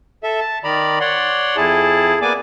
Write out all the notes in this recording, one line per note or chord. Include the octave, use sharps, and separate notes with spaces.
A4 E5
A5
D#3 D5 A#5 B5
C#5 D5 F#5 C6
F2 E4 G#4 A5
A#3 B3 D5 G#5 D6